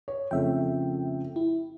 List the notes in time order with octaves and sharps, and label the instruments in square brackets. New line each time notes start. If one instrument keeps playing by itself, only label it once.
[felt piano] C#5
[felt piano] F2 C#3 A3 [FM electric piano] E5 G5
[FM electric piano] E4